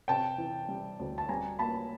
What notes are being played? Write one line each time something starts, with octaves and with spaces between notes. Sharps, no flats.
C3 G5 A5
E3
G3
D2
A5
G3 G#5 A#5
A#3 A5 B5